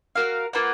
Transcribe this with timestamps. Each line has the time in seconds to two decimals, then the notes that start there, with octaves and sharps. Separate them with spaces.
0.15 F#4 A#4 F5
0.53 A#3 F4 B4 F#5